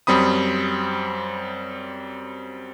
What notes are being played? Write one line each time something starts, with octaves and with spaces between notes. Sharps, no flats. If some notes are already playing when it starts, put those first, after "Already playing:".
F#2 G3 C4 B5 D#6